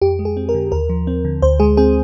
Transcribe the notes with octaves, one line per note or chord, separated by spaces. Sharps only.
F2 G4
G#3
G#4
C4
A#4
D3
D#2 A#4
F3
C4
D3
D2 C5
G#3 G#4
C4 G#4